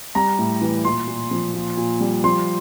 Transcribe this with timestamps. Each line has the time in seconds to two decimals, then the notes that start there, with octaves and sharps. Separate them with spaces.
0.15 G3 A#5
0.39 A2
0.62 E3
0.85 A#2 C6
1.08 A#2
1.31 F3
1.54 A#2
1.77 A#2
2.01 G3
2.24 F3 C6